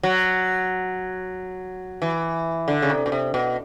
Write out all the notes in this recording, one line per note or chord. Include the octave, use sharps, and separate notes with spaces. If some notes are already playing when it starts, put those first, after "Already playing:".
F#3
E3
D3
C#3
C3
B2
C3
B2